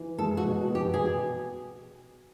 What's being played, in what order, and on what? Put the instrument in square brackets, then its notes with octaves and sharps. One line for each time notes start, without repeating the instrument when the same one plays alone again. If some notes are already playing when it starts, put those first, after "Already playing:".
Already playing: [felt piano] E3
[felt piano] G#3 [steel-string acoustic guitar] A4
[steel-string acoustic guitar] F#4
[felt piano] B2
B3
[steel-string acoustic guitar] G4
[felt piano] B2 [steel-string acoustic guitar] G#4